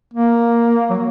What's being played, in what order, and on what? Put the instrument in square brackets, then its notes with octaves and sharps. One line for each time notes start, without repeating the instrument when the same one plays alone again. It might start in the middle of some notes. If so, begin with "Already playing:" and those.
[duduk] A#3
F#3